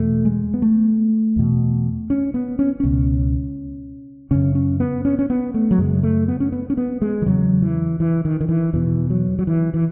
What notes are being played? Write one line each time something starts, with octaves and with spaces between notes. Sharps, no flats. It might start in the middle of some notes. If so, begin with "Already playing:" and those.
Already playing: E2 B2 A3
G#3
B3
A3
E2 B2
C#4
B3
C#4
C#2 B2 C#4
F#2 C#3 C#4
C#4
B3
C#4
C#4
B3
A3
F#3
F#2 C#3 G#3
A3
B3
C#4
B3
C#4
B3
G#3
E3
E2 C#3 F#3
E3
E3
D#3
D#3
E3
E2 B2 E3
F#3
F#3
E3
E3